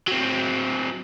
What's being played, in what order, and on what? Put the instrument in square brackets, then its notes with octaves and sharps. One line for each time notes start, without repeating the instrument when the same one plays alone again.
[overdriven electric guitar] F#3 C4